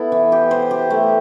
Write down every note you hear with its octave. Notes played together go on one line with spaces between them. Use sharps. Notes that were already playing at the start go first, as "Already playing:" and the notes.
Already playing: B3 E4 A4
E3
G4
C5
G4
A3